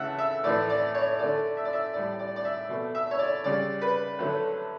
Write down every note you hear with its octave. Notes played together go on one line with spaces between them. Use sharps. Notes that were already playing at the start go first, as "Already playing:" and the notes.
Already playing: C#3 E3 A3 E5 F#5 A5
E5
A2 E3 A3 D5
D5
C#5
D3 A3 D5
E5
D5
E5
A2 G3 D5
D5
D5
E5
B2 A3
E5
C#5
D5
C#3 G3 D5
B4
D3 F#3 A3